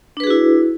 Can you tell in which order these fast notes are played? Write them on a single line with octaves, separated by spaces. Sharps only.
D4 B4 G#4 F#4 E4